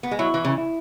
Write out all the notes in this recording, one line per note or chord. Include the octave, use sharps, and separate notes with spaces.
B3
G#3
F#3 E4
E3
C#3
E4